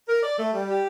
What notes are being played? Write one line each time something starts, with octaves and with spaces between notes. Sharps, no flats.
A#4
D5
A3
G3
G4